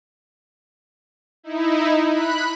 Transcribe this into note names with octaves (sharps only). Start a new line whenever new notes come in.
D#4 E4
B5 F#6